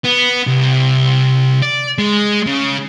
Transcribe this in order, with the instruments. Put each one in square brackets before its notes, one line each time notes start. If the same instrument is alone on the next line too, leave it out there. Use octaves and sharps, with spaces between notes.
[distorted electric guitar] B3
C2
D5
G#3
C#3